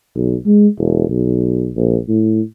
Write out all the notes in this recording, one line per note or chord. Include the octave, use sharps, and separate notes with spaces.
B1
G#3
E1
B1
A#1
A2